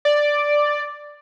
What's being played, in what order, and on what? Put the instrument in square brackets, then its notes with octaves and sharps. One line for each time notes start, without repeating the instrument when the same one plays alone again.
[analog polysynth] D5